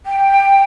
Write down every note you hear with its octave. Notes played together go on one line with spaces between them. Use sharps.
G5